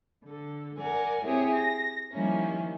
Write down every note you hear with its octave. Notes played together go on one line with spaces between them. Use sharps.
D3 A4
A#4 D5 F#5 G#5
C4 E4 G4 G#4 C#5
A#6
D#3 F3 G3 A#3 C#4 E4